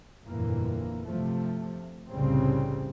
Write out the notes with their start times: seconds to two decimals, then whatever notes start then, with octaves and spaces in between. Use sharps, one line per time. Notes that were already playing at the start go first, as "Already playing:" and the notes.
0.26 G1 F2 A#2 E3 A#3
1.07 C3 F3 A3
2.09 F1 C2 A2 C#3 G3 C4